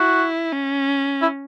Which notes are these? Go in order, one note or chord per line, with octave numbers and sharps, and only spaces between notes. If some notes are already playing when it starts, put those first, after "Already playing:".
Already playing: E4 F#4
C#4
E4